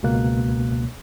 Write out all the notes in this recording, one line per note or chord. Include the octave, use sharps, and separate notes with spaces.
C#2 B2 A#3 F#6